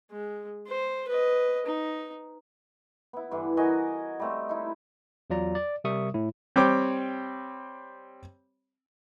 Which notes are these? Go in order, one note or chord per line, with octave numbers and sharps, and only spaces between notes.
G#3
C5
B4 D#5
D#4
B3 E4
G2 D3 E3
F#4 A#4 D#5 G#5
G3 A3 C4
D#4 E4
E2 F#3 F4 D5 A#5
D5
C3 G3 A#4 E5 C#6 D#6
A2 E4
G3 C4 C#5 G5 D6